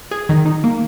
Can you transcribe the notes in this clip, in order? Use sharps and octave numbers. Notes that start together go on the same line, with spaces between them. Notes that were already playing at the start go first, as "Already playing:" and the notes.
G#4
D#3
D#4
A#3